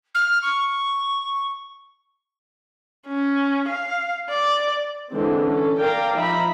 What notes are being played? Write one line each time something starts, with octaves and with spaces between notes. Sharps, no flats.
F6
C#6
C#4
F5
D5
D3 E3 G#3 C4
C#4 A4
A#4 D5 F5 G5 A#5
F3 D#4 E5 A#5 B5